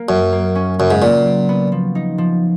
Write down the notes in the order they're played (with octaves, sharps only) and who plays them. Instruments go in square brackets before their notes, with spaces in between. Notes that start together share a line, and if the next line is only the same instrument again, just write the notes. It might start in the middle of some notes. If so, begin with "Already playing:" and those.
Already playing: [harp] A#3
[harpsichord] F#2 [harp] F#3
[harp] A#3
C#4
[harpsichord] F#2 [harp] C#3
[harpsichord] G#2
[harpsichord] A#2 [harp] F#3
[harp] A#3
B3
F3
D#4
F3